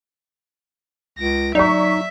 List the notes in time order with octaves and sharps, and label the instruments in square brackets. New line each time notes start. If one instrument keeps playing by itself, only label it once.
[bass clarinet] C#2 [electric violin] A#6 D7
[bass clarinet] F#3 [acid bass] D#4 [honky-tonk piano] D5 C#6 [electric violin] E5 B6